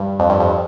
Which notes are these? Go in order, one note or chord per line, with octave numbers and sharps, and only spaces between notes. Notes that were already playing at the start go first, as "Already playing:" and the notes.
Already playing: G2
F2
G2
F2